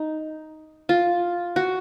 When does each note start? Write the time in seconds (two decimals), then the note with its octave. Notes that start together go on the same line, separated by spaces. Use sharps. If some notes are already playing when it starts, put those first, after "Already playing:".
Already playing: D#4
0.89 F4
1.56 F#4